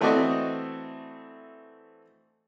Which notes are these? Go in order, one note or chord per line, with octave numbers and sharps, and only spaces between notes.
E3 A3 C4 F#4 D5 D#5